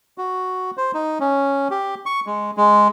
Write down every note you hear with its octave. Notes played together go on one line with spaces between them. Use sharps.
F#4
C5
D#4
C#4
G4
C#6
G#3
G#3